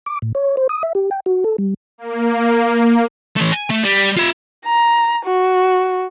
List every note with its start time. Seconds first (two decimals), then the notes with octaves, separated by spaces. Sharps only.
0.06 D6
0.22 A2
0.35 C#5
0.57 C5
0.69 D#6
0.83 E5
0.95 G4
1.11 G5
1.26 F#4
1.44 A4
1.58 G3
1.98 A#3
3.36 E3 A3
3.52 G#5
3.70 A3
3.84 G3
4.17 F4 E5
4.66 A#5
5.26 F#4